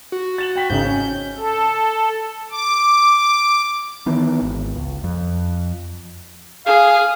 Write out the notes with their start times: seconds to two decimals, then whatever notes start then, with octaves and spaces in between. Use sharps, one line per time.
0.12 F#4
0.38 A6 E7 F#7
0.56 G5 B6 F#7
0.70 G#1 C#3 D#4 G6
0.84 C#4
1.38 A4
2.52 D6
4.06 D#3 E3 B3
4.42 G#1
4.76 C#2
5.04 F2
6.66 G#4 F5